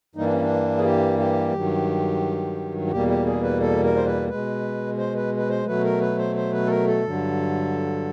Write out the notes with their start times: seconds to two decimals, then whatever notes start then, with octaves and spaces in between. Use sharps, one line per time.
0.15 G2 E3 G3 A#3 D#4
0.24 D4
0.33 C#4
0.41 D4
0.77 G#4
0.84 G4
1.19 G4
1.53 G2 D#3 F#3
2.87 F#4
2.91 E2 B2 G3 A#3 G4
3.08 G4
3.26 G#4
3.42 B4
3.60 A4
3.83 A#4
3.96 C5
4.06 B4
4.29 B2 G#3 B4
4.98 C5
5.15 B4
5.37 B4
5.49 C5
5.66 B2 F#3 A3 B4
5.84 A#4
6.01 B4
6.18 C5
6.36 C5
6.53 B4
6.66 A4
6.70 A#4
6.87 A4
7.04 G2 D3 F#3